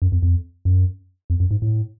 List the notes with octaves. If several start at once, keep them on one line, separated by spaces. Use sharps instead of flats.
F#2
F2
F2
F#2
F2
F#2
G#2
A2